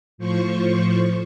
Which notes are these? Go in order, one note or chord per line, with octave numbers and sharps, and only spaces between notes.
A2 F3 C5 C#6